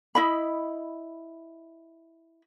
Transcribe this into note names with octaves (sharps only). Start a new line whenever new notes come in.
E4 D#5 B5